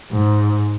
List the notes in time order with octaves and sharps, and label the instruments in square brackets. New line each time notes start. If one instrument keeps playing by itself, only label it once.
[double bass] G#2